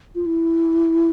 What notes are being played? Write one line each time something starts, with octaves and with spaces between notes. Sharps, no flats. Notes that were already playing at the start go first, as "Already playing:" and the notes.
F4
E4